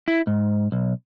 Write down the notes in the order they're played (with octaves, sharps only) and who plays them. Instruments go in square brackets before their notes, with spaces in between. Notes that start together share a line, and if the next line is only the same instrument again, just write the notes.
[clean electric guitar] E4
G#2
B1